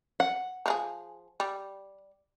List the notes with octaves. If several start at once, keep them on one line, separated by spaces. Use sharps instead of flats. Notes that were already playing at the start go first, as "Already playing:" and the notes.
F#5
F3 F4 G#4
G3